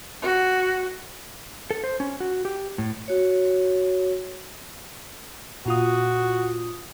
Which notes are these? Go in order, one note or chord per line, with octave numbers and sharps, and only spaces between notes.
F#4
A4
C5
C#4
F#4
G4
A2
F#4 C#5
A#2 F4 F#4 D#6